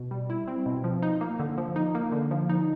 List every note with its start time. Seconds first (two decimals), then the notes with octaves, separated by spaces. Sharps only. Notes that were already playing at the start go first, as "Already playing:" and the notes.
Already playing: B2
0.11 G3
0.30 E4
0.48 C4
0.66 B2
0.84 F3
1.02 D#4
1.21 A#3
1.39 D3
1.58 F3
1.76 D#4
1.95 A#3
2.12 D3
2.31 F3
2.49 D#4